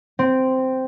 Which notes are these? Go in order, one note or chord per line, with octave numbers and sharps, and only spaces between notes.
C4